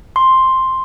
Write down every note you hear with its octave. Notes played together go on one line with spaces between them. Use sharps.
C6